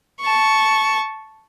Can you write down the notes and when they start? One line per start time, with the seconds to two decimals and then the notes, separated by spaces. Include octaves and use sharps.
0.21 A5 C#6